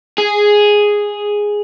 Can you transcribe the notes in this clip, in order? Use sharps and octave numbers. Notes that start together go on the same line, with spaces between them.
G#4